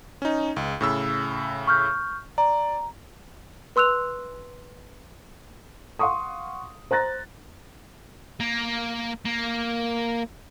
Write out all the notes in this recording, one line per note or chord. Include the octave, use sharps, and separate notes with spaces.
C#4 D#4
C#2
A2 C#3 E6
C#6 F6 G6
D5 A#5
B4 C6 E6 F#6 F7
F5 F#5 C6 C#6 D#6
C5 A#5 F#6 A6 A#6
A#3
A#3